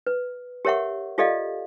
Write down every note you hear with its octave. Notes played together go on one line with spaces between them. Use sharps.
B4
G4 A#4 C#5 E5 F#5 C#6
F4 G4 A4 D5 D#5 F5